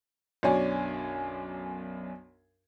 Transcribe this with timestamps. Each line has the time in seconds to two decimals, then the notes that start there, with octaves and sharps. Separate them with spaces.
0.43 B1 F#2 D4 C#5 G#5